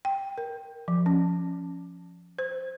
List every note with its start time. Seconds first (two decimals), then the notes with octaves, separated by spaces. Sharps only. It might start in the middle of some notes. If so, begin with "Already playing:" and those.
0.05 G5
0.38 A#4
0.88 F3
1.06 C#4
2.39 C5